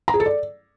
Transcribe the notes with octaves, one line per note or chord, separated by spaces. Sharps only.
A#5
G#4
A4
D5